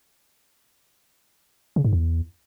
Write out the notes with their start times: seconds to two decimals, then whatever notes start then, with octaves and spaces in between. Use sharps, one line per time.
1.76 C#3
1.85 G#2
1.93 E2